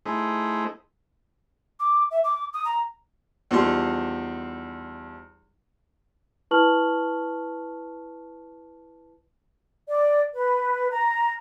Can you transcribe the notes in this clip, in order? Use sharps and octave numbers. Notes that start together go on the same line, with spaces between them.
A3 D#4 E4 G#4 C5
D6
E5
D6
D#6
A#5
E2 F3 G3 D#4 C6
E4 B4 A5 C#6 F6 F#7
D5
B4
A#5